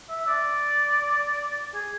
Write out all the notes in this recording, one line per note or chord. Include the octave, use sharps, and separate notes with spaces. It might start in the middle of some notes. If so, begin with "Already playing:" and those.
E5
D5
G#4